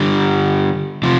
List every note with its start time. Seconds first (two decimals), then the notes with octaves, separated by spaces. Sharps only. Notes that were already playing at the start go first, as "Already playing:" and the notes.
Already playing: D3 G3
1.03 C3 F3